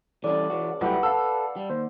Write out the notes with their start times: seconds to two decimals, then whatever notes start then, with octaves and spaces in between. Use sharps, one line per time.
0.24 D3 E3 G3 C#4 D5 A5
0.50 C#2 E3 F#4
0.81 C2 F#3 A3 E4 G4 B4 F#5
1.03 A4 F5 A5 E6
1.56 G3
1.70 D#2 C5